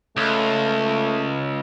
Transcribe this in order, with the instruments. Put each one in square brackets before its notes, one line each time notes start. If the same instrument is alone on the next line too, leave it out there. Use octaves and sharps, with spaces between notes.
[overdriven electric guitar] C#2 [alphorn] A3